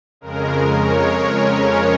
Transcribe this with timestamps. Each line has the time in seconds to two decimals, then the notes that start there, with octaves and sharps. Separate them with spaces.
0.21 F2 C#3 G#3 A#4
0.77 C#5
1.33 C#4